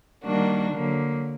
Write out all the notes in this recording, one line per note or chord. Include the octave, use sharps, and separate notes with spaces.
D#3 G3 A#3 D4 F#4
D3 F#3 A#3